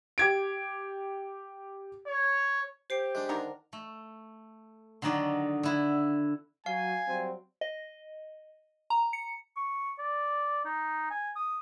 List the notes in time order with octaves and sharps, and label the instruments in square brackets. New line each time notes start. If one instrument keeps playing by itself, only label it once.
[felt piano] G4 G#6 D7
[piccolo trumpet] C#5
[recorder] G4 [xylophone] C5 C7 D7
[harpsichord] G#3 D4
[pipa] D3 D#3 A#4
[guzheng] A3
D3 D#3 F#3 D#4 D5
D3 E4
[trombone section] F#3 [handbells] F5 [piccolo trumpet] G#5
[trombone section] F#3 G3 C4
[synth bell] D#5
A#5
C#7
[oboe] C#6
D5
D#4
G#5
D#6